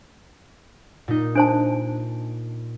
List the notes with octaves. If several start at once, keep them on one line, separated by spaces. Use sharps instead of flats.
A#2 D#4
D4 C5 A5 D7